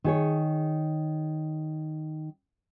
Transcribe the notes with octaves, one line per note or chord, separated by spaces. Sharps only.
D#3 G#4 C#5